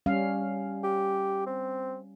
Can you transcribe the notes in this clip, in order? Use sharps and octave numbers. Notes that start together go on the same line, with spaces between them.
G3 C#4 F5
G4
C4